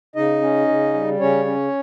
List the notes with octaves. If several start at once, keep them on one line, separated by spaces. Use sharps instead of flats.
C#3 D#4 D#5
C#4
C#3
G3
C#3 C#4 C#5
C#4